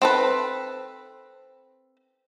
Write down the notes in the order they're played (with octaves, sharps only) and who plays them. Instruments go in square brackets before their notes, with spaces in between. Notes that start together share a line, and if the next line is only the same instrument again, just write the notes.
[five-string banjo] C4 A4 B4